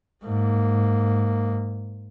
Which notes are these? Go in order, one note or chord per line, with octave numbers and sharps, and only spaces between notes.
G#2 A#3